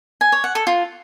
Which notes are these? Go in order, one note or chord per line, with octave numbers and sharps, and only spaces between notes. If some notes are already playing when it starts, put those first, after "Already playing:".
G#5
C#5
F#5
A4
F4